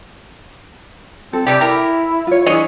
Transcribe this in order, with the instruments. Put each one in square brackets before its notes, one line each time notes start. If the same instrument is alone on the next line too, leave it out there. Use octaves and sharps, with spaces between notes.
[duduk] C4 [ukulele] A4
[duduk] C3 [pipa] E3 G3 G4
[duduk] E4 [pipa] G4 A#4
[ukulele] F4 C#5
[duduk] E3 [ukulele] D4 E4 [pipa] G#4 C#5 D#5